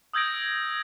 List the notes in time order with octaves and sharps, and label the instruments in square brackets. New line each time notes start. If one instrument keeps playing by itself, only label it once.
[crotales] D#6 E6 G6 G#6 A#6 D7